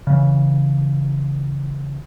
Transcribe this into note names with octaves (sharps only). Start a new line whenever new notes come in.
C#3 E3